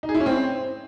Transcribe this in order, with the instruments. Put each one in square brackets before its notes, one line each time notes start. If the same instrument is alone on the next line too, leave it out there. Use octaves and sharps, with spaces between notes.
[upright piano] D#4
G#4
E4
C#4
C4